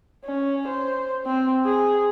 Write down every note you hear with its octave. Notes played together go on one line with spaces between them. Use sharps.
C#4
C5
C4
G#4